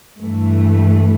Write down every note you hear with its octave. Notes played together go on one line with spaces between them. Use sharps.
G2 E3 A3